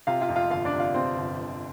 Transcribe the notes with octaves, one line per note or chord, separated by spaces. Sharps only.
C3 F4 F5
F4 F5
F2
F4 F5
G1 F4 F5
D4 D5
C3
F4 F5
C3 C4 C5
G1
G1